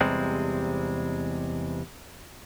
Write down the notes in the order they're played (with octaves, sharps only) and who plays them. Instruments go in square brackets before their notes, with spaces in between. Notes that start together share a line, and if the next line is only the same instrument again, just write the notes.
[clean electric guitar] E2 C3 G3 G#3 C4